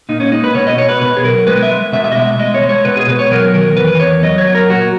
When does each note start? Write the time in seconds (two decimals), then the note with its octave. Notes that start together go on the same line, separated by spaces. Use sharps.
0.09 A#2 D#4
0.20 C#4
0.32 G#3 D#4
0.44 B4
0.55 B2 C#5
0.67 D#5
0.78 B2 C#5
0.89 B4
1.01 B2 B4
1.17 G#4
1.24 F#3 A#4
1.47 G#3 B4
1.63 E5
1.70 G#3
1.92 B2 E5
2.04 E5
2.12 D#5
2.15 G#3 E5
2.27 E5
2.39 G#3 D#5
2.55 C#5
2.62 G#3
2.69 C#5
2.85 B2 B4
2.97 G#4
3.08 B2 B4
3.19 C#5
3.31 F#3 A#4
3.54 D#3 A#4
3.77 E2 B4
4.00 E2 C#5
4.23 F#3 D#5
4.38 C#5
4.46 F#3
4.55 A#4
4.70 A#2 F#4